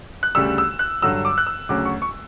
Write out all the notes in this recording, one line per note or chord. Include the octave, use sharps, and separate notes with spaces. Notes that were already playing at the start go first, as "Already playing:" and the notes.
F#6
D2 C#3 G3 E6
E6
F#6
G2 D3 F#3 E6
D6
F#6
E6
D2 C#3 F#3 D6
C#6
C#6